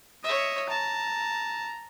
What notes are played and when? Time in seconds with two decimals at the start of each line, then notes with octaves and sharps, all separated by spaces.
0.24 C#5 D#5 E5
0.70 A5 A#5